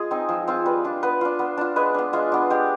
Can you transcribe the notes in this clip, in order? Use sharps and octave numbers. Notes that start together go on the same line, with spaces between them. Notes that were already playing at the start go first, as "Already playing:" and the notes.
Already playing: G#3 F4 G#4
C4 D#4
F3
C4 F4
G3 B4
D4 F4
B3 B4
D4 F4
B3
D4 F4
G#3 B4
B3 D4
G#3 F4
B3 D4
G#3 G4